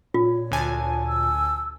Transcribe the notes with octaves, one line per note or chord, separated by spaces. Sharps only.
A#2 F4 C#5
D2 G#5 A5
E6